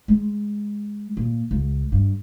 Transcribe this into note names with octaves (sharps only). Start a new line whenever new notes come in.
G#3
A#2
C#2
G2